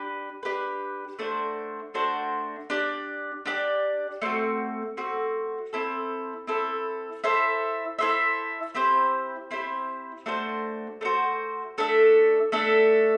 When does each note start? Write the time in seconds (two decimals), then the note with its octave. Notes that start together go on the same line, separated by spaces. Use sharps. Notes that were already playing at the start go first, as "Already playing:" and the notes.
Already playing: D4 G4 B4
0.43 D4 G4 B4
1.19 A3 D4 F#4 C5
1.94 A3 D4 F#4 C5
2.70 D4 G4 D5
3.46 D4 G4 D5
4.22 A3 C4 F#4
4.97 A3 C4 F#4
5.73 C4 E4 A4
6.47 C4 E4 A4
7.24 E4 A4 C5 E5
7.99 E4 A4 C5 E5
8.75 C4 E4 G4 C5
9.51 C4 E4 G4 C5
10.26 A3 D4 F#4 C5
11.01 A3 D4
11.05 F#4 C5
11.78 A3 D4 A4 E5
12.52 A3 D4 A4 E5